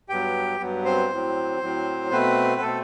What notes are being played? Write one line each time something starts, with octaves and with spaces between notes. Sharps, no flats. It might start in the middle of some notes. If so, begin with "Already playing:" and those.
G2 F#3 B3 G4 G5
G2 F#3 B3
C4 C5
A2 F#3 C4
A2 F#3 C4
B2 A3 B3 C4 B4
B2 A3 C4 A4